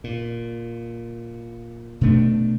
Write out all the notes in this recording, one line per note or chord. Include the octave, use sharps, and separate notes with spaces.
A#2
B2 A3 D4